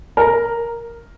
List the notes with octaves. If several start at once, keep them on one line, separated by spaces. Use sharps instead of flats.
A#4